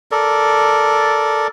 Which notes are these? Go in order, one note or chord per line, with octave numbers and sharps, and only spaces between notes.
A4 A#4 D5